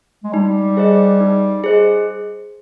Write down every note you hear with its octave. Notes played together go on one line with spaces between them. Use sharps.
G#3
G3 D#4
G#4 C5 D#5
D#4
G#4 C5 D#5